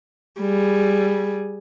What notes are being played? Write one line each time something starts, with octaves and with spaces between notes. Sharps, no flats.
G3 G#4